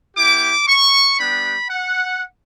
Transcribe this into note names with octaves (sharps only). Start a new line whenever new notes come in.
B3 E4 G4 D6
C#6
G3 B3 D4 G4 B5
F#5